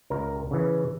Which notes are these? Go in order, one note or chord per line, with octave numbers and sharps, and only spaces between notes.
C#2 A#4
C#3 E3